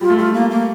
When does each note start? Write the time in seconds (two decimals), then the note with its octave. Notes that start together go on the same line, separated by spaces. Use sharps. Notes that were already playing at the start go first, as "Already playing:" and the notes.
0.01 G3 F4
0.10 A3
0.17 G3 F4
0.34 A#3
0.50 A#3